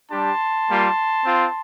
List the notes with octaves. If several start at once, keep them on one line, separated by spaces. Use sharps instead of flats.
G3 D4 G4 A5 C6
G3 A#3 F4
C4 F4